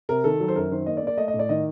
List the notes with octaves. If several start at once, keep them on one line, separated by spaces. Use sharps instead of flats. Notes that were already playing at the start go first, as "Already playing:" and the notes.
C3 A#4
D#3 A4
F#3
C5
F#2 A#4
D#3 C5
A#3 D#5
D5
A#3
D5
A3 D#5
D#5
A2
D5
D#3 D#5